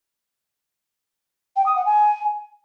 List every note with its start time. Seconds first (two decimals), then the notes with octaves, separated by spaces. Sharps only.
1.56 G5
1.66 D#6
1.76 F#5
1.86 G#5